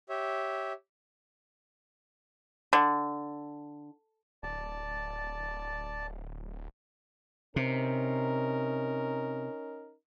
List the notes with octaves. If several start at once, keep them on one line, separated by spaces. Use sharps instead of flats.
G4 C#5 E5
D3
D1 D5 A5
C3 C#4 D#4 A#4